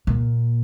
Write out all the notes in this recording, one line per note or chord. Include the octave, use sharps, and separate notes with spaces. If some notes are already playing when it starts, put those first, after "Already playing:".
A#2